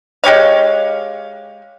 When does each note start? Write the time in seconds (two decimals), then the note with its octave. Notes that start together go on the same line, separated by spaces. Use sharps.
0.24 G#3 G4 C#5 F5